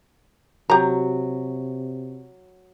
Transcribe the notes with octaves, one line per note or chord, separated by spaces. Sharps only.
C3 F#3 G4 A#5